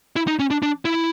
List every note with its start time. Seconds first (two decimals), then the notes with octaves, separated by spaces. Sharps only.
0.16 E4
0.27 D#4
0.39 C#4
0.50 D4
0.62 D4
0.85 E4